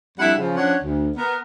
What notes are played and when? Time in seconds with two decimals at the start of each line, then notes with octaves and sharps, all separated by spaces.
0.18 F2 G3 D4 E4 E5 F#5
0.37 C#3 F3
0.56 F3 C#4 D4 C#5 F#5
0.82 D2
1.16 B3 A#4